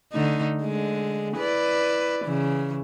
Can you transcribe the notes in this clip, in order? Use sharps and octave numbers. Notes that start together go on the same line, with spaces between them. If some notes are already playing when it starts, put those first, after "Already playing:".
D3 A3 D#4
D3 G#3
E4 B4 D5
C#3 E3